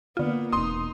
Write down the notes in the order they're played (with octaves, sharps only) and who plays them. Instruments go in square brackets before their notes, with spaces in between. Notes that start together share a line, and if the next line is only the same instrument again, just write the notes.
[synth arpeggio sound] D3 F4 [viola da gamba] A#3 B3
[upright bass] E1 C4 [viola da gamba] D#4 [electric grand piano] C6 D#6